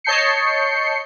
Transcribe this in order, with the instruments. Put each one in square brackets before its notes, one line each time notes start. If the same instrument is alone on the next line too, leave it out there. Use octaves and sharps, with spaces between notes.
[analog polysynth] C#5 D#5 A5 G6 C7 C#7